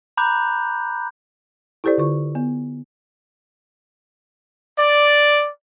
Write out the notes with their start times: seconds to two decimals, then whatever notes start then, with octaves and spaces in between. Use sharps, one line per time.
0.17 A#5 B5 D6 F#6 G6
1.84 E4 G4 A4 C5 D5
1.98 D3 F4 C#6
2.35 B3
4.78 D5